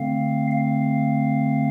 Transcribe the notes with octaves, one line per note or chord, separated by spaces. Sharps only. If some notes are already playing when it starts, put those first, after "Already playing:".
Already playing: D3 A3 C4 F5
F5